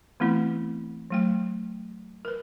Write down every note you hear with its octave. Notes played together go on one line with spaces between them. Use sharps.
E3 A3 B3 C4 E4
F#3 A3 G5
A#4 B4